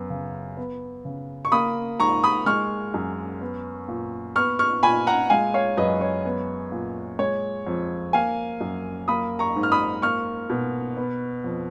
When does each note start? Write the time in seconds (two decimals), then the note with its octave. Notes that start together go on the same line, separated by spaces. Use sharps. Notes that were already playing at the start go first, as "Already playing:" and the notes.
Already playing: F#2 B3
0.10 C#3
0.57 B3
1.05 C#3
1.45 C#6
1.52 A#3 B5 D#6
2.00 G#2 A#5 C#6
2.24 B5 D#6
2.46 G#3 C#6 F6
2.94 F#2
3.41 B3
3.88 A#2
4.36 B3 C#6 F6
4.59 C#6 F6
4.83 A#2 G#5 B5
5.07 F#5 A#5
5.30 G#3 F5 G#5
5.54 C#5 F5
5.77 F#2 B4 D#5
6.01 C#5
6.25 B3
6.72 A#2
7.19 G#3 C#5
7.67 F2
8.13 A#3 F5 G#5
8.61 F#2
9.08 A#3 B5 D#6
9.39 A#5 C#6
9.56 G#2
9.63 F6
9.72 B5 D#6
10.02 A#3 C#6 F6
10.50 B2
10.97 B3
11.44 F2